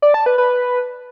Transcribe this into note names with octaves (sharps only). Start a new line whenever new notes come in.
D5
A5
B4
B4